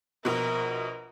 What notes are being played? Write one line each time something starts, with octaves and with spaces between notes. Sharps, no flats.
A#1 B2 A#4